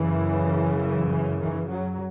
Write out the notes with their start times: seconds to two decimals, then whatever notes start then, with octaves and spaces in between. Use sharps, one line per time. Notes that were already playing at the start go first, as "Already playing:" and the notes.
Already playing: F#2 C#3 E3
1.09 E3
1.39 E3
1.68 F#3